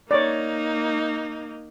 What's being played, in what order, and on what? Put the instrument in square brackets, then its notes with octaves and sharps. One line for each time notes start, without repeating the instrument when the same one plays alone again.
[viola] A#3 D#4 [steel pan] C#5 D5